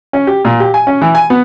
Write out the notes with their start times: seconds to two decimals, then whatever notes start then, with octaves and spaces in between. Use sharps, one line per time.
0.13 C#4
0.27 G4
0.45 A#2
0.60 G4
0.74 G#5
0.87 C#4
1.01 E3
1.15 G#5
1.30 B3